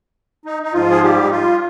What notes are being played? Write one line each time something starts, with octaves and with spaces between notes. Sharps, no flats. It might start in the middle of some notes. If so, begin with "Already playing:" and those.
D#4
D#4
G#2 F3 F4
G#4
G3 G4
D#4
F4